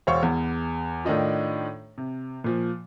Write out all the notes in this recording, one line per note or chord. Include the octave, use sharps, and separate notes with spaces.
E1 C5 C#5 F5 C#6
E2
A2 D#3 D4 D#4 F4
C3
A#2 F3